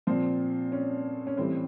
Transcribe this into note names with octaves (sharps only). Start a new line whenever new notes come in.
A#2 F3 C4
C#4
C#4
A2 E3 G3 C4